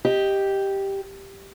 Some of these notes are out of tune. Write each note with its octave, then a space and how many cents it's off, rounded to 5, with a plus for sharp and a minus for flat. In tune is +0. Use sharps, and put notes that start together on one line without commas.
G4 +0 D#5 +0